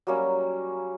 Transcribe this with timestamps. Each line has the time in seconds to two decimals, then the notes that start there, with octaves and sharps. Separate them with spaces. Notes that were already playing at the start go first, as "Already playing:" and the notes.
0.07 F#3 G3 A#3 C#4